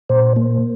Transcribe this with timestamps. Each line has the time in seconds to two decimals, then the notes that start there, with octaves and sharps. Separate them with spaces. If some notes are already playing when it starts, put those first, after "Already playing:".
0.09 A#2 C5
0.36 A#3